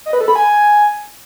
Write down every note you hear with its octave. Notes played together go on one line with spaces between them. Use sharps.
D#5
B4
A4
B5
G#5